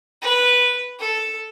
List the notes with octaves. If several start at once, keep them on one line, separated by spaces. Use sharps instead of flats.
B4
A4